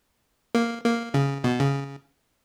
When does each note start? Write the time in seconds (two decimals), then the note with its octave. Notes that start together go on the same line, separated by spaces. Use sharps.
0.55 A#3
0.84 A#3
1.14 C#3
1.44 B2
1.60 C#3